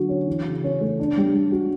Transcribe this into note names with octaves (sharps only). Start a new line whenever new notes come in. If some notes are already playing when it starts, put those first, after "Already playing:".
Already playing: D3 F#3 F#4
C#4
E3
C#3
C#4
A3
D4
G3
G3
F#4